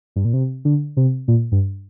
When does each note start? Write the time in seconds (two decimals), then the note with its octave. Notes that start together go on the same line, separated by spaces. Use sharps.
0.16 G2
0.25 A#2
0.33 C3
0.65 D3
0.97 C3
1.28 A#2
1.52 G2